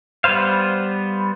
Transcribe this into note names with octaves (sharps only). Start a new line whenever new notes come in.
G3 B3 B4 C5 F5